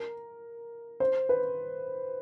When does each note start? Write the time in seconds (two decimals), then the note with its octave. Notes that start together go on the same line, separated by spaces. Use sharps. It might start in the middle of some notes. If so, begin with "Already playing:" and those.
Already playing: A#4
1.00 C5
1.29 B4